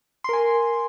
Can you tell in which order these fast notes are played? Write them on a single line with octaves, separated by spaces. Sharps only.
C6 A#4 G#5